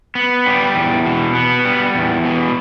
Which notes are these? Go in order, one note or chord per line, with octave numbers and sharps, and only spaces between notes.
B3
G3
E2
B2
B3
G3
E2
B2